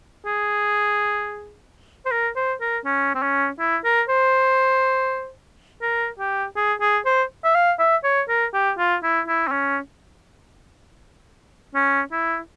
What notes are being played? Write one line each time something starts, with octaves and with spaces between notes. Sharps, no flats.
G#4
C5
A#4
C5
A#4
C#4
C4
C#4
E4
A#4
C5
A#4
G4
G#4
G#4
C5
E5
F5
E5
C#5
A#4
G4
F4
E4
E4
C4
C#4
C#4
E4